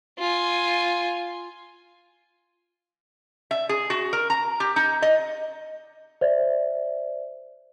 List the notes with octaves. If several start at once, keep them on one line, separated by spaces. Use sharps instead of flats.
F4 G#5
E5
G#4
F#4
A#4
A#5
G4
D#4
D#5
C5 D5 E5